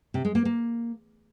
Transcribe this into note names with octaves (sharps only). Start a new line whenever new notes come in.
C3
G#3
A#3
A#3